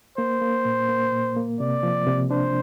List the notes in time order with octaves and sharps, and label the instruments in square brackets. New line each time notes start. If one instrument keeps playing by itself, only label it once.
[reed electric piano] A#3 [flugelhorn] C5
[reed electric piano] A#3
A#2
A#3
A#2
A#3
[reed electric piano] C3 [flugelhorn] D5
[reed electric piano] F3
C3
[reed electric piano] D4 [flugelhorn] C5